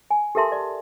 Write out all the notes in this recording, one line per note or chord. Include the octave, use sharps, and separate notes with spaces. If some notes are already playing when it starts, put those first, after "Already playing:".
G#5
G4 A4 A#4 E5 A5 C6
D5